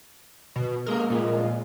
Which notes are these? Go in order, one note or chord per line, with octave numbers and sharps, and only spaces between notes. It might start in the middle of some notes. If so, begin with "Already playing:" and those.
B2
D#2 G#3 A#3 A#4
C2 A#2 F3 G#3